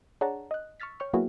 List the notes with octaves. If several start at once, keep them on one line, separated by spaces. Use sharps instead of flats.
D4 G#4 C#5 F#5 A5 A#5
D#5 F#6
C#6 E6 F6 A6 B6
C#5 G5 C#6 F6
F#3 A#3 B3 E4 F#4 G#4